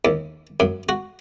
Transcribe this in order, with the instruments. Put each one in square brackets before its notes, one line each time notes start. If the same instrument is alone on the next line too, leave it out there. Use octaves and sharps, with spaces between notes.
[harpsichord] D#2
F#2
F#4